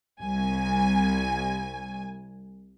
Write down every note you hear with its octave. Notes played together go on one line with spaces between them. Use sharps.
C2 G#5